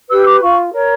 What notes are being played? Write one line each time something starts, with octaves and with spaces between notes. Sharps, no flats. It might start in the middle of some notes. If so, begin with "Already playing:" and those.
G4 B4 E6
D6
F4 C#6
A#4 C#5